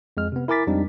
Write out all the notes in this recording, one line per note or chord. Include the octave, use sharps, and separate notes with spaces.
F2 G#3 F6
C3 B3
E4 A#4 G#5 D6 A6 B6
F2 G3 G#3 C4 D4 D#4